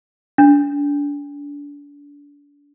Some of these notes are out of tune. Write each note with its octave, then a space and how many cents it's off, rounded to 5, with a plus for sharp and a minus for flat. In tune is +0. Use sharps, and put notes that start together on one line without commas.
D4 -35